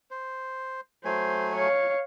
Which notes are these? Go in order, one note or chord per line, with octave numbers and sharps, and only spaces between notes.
C5
F#3 A3 C5 G#5
C#5 F5